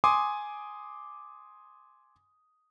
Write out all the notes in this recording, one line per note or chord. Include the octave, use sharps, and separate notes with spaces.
G#5 C6 D6 D#6